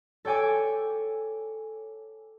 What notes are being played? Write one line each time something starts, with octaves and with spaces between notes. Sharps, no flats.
A4 C#5 G5 G#5 D6